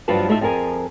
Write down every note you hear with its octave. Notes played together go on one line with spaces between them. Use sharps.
G2 F3 F#3 F4 B4 A5
A2 A3 D#4 F4 A4 E5
F2 F3 G#4 A#4 G#5